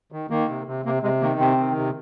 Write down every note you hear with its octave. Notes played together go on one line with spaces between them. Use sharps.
D#3
D#3 A#3
C3
C3
C3 A#3
C3 G#3
D#3 A#3
C3 C4
D#3
C3